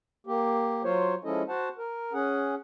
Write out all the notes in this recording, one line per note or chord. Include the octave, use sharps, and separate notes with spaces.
A#3 G4
F#3 F4 C5 C#5
F3 G#3 C#4 E4 A4 D#5
F#4 C5 F#5 A5
A#4
C#4 G#4 F#5